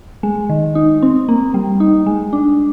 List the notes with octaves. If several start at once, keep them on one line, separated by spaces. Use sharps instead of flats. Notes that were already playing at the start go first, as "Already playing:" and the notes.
G#3
D#3
D#4
C4
A#3
G3
D#4
G#3
D4